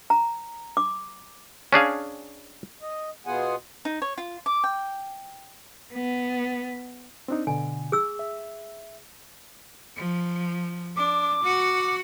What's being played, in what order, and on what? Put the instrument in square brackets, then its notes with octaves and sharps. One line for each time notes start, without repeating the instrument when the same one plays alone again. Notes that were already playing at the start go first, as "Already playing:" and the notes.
[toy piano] A#5
D6
[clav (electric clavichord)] C#4 D4 G#4 F5
[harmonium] D#5
B2 B3 F4 G#4 F#5 G#5
[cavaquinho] D#4
C#5
F4
D6
G5
[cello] B3
[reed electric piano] C4 D4 D#4
[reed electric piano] B2 D3 [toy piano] G#5
[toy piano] G#4 E6
[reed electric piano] E5
[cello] F3
[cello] D4 [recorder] D6
[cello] F#4 F#5